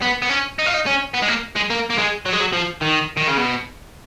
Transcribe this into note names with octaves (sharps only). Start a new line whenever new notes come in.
B3
B3
C#4
D#4
F4
D#4
C#4
B3
G#3
A#3
G#3
A#3
A#3
G#3
F#3
G#3
F#3
F3
D#3
D#3
C#3
B2